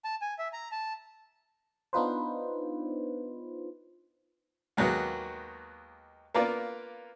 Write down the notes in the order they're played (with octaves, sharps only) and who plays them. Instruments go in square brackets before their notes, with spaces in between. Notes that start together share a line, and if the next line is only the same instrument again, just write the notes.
[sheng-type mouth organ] A5
G#5
E5
A#5
A5
[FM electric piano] B3 D4 D#4 F4 B4 C5
[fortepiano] D#2 F#3 G#3 A#3 B3
A#3 B3 F4 A#4 D5